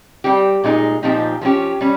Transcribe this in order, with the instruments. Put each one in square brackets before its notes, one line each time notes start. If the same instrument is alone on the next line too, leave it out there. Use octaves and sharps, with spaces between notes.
[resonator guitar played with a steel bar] G3 C4 G4
A#2 G#3 D#4 G#4
A#2 F3 C4 D#4 G4
F3 A#3 C#4 G4
G3 C#4